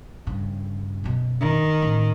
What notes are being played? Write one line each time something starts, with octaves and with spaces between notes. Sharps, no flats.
G2 C#3
F#2 B2
D#3
A1